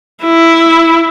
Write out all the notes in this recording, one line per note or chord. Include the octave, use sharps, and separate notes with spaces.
E4